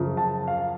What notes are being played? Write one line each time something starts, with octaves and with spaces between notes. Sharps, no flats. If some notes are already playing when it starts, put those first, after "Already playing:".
Already playing: F#2 C#3 F3
A5
F5